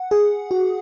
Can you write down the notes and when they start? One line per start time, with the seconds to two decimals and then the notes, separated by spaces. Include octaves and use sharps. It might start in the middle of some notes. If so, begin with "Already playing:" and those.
Already playing: F#5
0.11 G#4
0.51 F#4